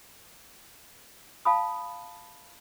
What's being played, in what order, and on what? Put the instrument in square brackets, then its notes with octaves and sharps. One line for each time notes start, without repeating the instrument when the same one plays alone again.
[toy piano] F5 A5 B5 D#6